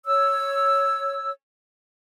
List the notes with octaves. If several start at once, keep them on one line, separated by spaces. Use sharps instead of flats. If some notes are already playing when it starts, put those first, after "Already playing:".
C#5 E6